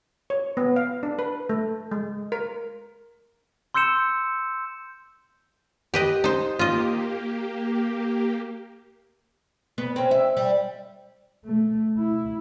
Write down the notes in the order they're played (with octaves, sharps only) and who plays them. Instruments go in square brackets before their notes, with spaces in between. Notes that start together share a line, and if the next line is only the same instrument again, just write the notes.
[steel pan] C#5
B3
F5
D4
B4
A3
G#3
A#4
[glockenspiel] C6 E6 G6 C#7 E7
[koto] G4 B4 D#5
D#4 C5
[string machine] A#3 G4 [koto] F4 D#5
[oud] B3
C4 C#4
E5
G3
[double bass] A3
E4